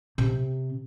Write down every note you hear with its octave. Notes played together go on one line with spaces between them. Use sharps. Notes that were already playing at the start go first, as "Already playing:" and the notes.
C3